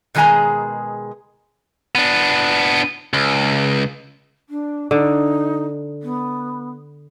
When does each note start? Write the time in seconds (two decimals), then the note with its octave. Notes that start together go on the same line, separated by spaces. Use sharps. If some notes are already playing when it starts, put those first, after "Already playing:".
0.15 B2 D#3 G#3 G#4 G#5 A#5
1.95 B3 D4
3.13 C#2
4.49 D4
4.91 D3 D#4
6.03 B3